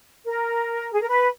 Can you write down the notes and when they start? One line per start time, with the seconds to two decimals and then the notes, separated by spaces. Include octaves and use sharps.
0.25 A#4
0.92 G#4
1.01 A#4
1.08 B4